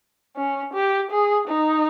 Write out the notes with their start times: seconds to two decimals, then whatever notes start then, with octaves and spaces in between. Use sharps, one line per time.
0.37 C#4
0.74 G4
1.11 G#4
1.48 D#4